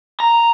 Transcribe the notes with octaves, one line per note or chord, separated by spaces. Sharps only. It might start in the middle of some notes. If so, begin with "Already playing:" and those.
A#5